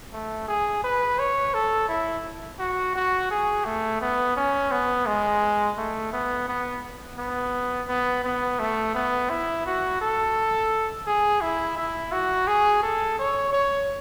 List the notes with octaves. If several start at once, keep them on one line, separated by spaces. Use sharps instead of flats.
A3
G#4
B4
C#5
A4
E4
F#4
F#4
G#4
A3
B3
C#4
B3
G#3
A3
B3
B3
B3
B3
B3
A3
B3
E4
F#4
A4
G#4
E4
E4
F#4
G#4
A4
C#5
C#5